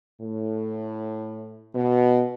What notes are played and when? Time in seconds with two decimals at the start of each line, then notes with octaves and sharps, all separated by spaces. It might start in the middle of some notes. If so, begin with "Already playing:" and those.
0.21 A2
1.75 B2